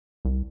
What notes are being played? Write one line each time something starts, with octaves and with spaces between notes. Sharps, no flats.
C2